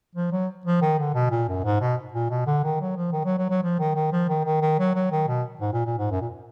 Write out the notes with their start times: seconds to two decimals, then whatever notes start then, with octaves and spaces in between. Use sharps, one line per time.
0.15 F3
0.32 F#3
0.66 F3
0.82 D#3
0.99 D3
1.14 B2
1.31 A#2
1.48 F#2
1.64 G#2
1.81 B2
2.13 A#2
2.30 B2
2.46 D3
2.64 D#3
2.81 F#3
2.96 F3
3.12 D#3
3.25 F#3
3.38 F#3
3.50 F#3
3.63 F3
3.79 D#3
3.95 D#3
4.12 F3
4.29 D#3
4.45 D#3
4.61 D#3
4.79 F#3
4.95 F#3
5.11 D#3
5.28 B2
5.61 G#2
5.73 A#2
5.86 A#2
5.98 G#2
6.11 F#2
6.21 A#2